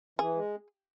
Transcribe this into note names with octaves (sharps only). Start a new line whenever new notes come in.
E3 G#4
G#3